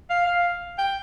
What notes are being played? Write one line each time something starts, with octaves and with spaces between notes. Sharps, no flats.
F5
F5
G5